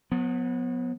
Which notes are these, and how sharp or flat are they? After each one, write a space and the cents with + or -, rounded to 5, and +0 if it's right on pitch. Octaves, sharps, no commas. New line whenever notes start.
F#3 -40 B3 +0